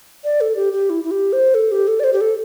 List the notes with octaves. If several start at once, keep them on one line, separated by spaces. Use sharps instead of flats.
D5
A4
G4
G4
E4
E4
G4
C5
A4
G4
A4
D5
C5
G4
A4